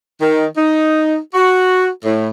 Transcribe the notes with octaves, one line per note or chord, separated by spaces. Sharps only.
D#3
D#4
F#4
A2